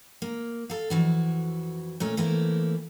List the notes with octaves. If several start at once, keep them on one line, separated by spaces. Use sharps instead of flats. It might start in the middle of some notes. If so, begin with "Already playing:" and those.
A#3
A4 F5
F2 E3 F#4
A#2 A3 C#4
E3 A3 A#3 C4 E4